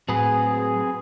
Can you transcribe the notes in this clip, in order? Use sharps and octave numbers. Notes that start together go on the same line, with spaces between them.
A2 F#3 C4 G#4 B4